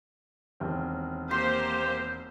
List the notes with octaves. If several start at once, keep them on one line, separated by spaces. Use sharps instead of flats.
E1 D#2 C4
A#3 G4 C5 C6